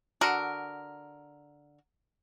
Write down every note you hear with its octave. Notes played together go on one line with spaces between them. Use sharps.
D3 F#4 A#4